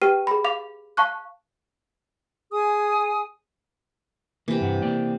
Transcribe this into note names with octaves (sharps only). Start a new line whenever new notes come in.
G4 B4 G5 F6 C7 D#7
G#4 B5
F5 D6 F7
F5 A5 C#6 F#6
G#4 G#5 D#6
C3 E3 A#3
G2 F#5
A#3 D5 G5